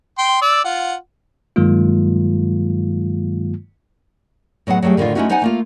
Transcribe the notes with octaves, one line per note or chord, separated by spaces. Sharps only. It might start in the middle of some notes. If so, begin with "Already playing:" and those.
G5 C6
D5 E6
F4 F#5
G2 D#3 F#3 G#3 A#3 F4
A2 F#3 B3 G#4 F#5
F#3 G3 A3 G#4 G5
A2 D3 D#3 G#3 D#4 F4
G#3 A3 C#4 D#4 E4 F#4
B3 D#4 C5 D#5 F#5 G#5
A3 A#3 F4